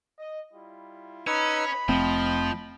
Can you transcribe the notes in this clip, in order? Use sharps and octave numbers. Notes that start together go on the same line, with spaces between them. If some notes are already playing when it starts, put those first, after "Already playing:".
D#5
G3 E4 F4
C#4 D#4 B4 B5 E6
F1 F3 A3 C4 D#5 G5